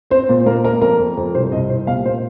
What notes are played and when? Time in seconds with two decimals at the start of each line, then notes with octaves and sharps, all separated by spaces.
0.11 C4 C5
0.29 A#2 C5
0.46 A#3 A#4
0.64 A#3 A#4
0.81 F2 A#4
0.99 F2
1.17 F2
1.35 C2 C5
1.52 C2 D#5
1.69 C2 C5
1.87 A#2 F5
2.05 A#3 C5